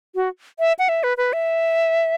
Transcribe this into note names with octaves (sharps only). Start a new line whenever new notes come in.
F#4
E5
F#5
E5
B4
B4
E5